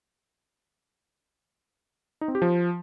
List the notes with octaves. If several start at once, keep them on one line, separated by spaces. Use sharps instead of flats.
D#4
C4
G4
F3